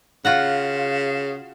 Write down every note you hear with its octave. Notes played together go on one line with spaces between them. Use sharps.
C#3 F4 F#4 F#5